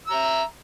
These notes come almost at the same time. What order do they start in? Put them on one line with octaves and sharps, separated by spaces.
E6 A#5 E5